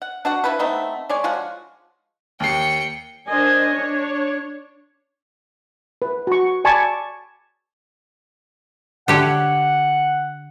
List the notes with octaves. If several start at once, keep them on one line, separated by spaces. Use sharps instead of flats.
F#5
D4 F#4 F#5
F3 E4 B4
A3 B3 C4 D#4
G#3 C#5 D5 G#5
F3 G#3 F4 F#4
D#2 G5 C7 C#7
D4 A#4 C5 D#5 G#5
D4 C#5
B4
F#4 C#6
D5 G#5 A5 B5 C#6 D6
D3 G4 C#5 F#5